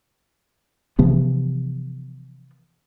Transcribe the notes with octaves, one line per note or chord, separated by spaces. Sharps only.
C3 E3 F3 B3